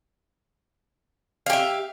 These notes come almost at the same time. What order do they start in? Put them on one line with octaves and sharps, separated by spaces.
F5 G4 E5